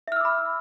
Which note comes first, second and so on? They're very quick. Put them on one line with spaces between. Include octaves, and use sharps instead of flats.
E5 F6 E6 D6 B5